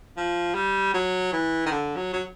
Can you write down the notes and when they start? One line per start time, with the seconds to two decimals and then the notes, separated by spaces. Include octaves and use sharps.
0.17 F3
0.55 G3
0.94 F#3
1.33 E3
1.66 D#3
1.71 D3
1.96 F#3
2.13 F#3